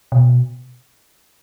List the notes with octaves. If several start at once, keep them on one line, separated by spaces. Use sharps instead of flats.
B2